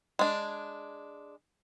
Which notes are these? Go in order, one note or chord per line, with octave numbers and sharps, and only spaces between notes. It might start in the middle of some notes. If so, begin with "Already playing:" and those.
G#3 D4